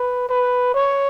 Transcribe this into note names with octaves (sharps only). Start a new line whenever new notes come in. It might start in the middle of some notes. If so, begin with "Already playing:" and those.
Already playing: B4
B4
C#5